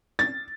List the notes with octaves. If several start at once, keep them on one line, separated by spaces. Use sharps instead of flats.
A6